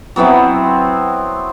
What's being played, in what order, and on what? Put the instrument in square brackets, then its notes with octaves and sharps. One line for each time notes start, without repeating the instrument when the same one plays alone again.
[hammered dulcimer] F#3 B3 C4 E4